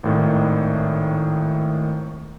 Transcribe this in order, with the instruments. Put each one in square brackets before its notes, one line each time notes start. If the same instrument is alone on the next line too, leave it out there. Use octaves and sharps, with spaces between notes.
[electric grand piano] G#1 A2 D#3